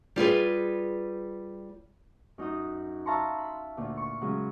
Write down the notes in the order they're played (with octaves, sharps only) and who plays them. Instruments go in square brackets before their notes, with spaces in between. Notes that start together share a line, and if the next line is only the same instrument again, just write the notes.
[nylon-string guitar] G3 F4 G#4 B4
[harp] F#2 D#4 F#4 D#6
E5 F5 A5 A#5 C6 C#6
B5
D2 A#2
C#6
C#3 F#3 G#3 C#4